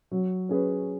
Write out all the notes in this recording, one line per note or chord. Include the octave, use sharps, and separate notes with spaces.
F#3
C#4 G#4 B4